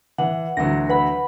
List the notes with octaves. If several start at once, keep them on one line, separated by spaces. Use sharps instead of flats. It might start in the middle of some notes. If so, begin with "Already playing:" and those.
E3 F#5
D2 E3 F#3 A#6
B4 F#5 B5